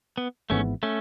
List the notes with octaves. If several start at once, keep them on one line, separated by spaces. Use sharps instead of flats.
B3
G#1 G#2 E3 A3 B3 C#4
A3 C#4